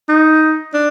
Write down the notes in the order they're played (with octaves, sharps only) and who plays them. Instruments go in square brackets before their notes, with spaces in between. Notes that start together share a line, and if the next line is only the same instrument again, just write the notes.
[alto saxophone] D#4
D4